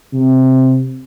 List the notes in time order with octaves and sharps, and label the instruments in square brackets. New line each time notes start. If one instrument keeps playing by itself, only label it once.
[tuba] C3